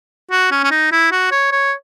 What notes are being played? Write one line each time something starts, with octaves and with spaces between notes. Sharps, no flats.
F#4
C#4
C#4
D#4
E4
F#4
C#5
C#5